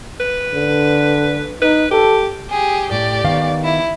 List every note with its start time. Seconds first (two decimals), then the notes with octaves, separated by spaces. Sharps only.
0.20 B4
0.54 D3
1.62 D#4 B4
1.91 G4 A4
2.50 G4 G#4
2.91 A2 G4 D5
3.24 D#3 B3 F5
3.64 E4